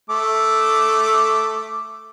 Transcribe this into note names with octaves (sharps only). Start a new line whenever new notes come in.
A3 D6